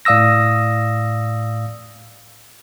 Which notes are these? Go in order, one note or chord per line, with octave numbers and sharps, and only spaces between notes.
A2 D5 F5 D#6 E6 A#6